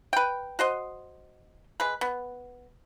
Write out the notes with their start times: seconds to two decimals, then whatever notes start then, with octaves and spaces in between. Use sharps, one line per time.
0.13 B4 G5
0.59 F#4 C5 D#5
1.80 G#3 B4
2.01 B3